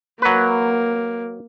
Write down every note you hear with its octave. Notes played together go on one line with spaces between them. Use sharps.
F#3 A#3 B4